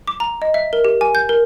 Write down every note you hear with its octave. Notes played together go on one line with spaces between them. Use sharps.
D6
A#5
D#5
E5
A#4
G4
G#5
G6
A#4